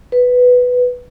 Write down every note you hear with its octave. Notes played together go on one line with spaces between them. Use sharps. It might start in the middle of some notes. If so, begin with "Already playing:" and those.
B4